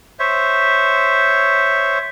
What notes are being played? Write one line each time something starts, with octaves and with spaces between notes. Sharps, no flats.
C5 C#5 E5